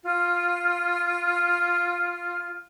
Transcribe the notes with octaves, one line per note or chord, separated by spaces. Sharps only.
F4 F6